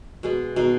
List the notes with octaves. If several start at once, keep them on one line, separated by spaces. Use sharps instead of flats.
B2 G#3 B3
B2 G#3 D#4